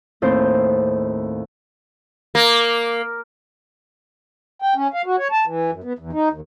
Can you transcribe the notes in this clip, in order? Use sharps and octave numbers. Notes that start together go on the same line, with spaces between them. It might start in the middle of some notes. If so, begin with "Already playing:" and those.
D#2 A2 C4 C5
A#3
G5
C#4
F5
F#4
C#5
A5
E3
F#2
B3
E2
D#4
D#2